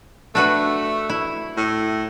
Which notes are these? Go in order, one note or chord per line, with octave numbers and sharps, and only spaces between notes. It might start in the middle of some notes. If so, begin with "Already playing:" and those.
A3 D4 F#4 B4
E4
A2